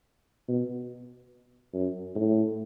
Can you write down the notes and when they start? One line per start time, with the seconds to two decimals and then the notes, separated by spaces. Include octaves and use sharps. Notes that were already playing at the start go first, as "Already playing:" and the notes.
0.48 B2
1.73 F#2
2.15 A2